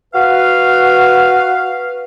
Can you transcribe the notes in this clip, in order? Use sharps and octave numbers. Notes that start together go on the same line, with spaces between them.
F#4 B4 F5